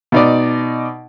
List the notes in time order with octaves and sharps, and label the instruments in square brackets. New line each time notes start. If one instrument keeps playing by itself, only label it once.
[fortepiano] B2 D#4 D5